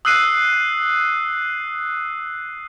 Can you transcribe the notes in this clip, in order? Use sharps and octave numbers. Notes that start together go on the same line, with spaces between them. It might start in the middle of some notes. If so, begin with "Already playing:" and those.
D#6 E6 F#6 C7 D#7